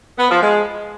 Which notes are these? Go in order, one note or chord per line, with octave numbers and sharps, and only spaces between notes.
B3
F3
G#3